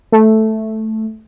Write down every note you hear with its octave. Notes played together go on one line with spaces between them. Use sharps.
A3